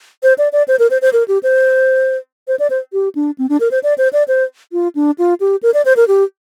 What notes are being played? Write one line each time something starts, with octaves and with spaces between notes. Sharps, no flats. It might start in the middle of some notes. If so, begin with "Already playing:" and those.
C5
D5
D5
C5
A#4
C5
C5
A#4
G4
C5
C5
D5
C5
G4
D4
C4
D4
A#4
C5
D5
C5
D5
C5
F4
D4
F4
G4
A#4
D5
C5
A#4
G4